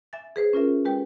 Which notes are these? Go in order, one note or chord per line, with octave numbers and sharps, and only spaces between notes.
E5 G#5 A6
G#4 B4 C5
C#4 F4 A#4 E5
G#3 G4 B4 G5